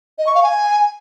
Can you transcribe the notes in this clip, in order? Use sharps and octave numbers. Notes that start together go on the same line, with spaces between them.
D#5
C#6
F5
G#5